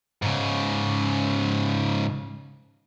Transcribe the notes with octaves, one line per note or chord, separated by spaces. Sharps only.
G#2 C#3